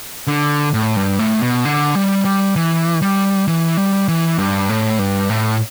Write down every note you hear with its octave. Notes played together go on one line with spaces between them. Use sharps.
D3
A2
G2
A2
B2
D3
G3
G3
E3
G3
E3
G3
E3
G2
A2
G2
A2